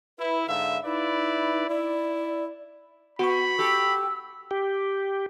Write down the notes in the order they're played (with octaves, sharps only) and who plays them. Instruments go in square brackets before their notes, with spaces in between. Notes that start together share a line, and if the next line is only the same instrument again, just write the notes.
[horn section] E4 [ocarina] B4
[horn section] G#2 D3 E5 [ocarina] F5
[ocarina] D#4 [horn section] E4 B4 D5
[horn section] E4 [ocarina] D5
[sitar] B3 [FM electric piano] F#4 C#6 [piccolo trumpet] B5
[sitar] G4 A4 [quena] E6
[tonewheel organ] G4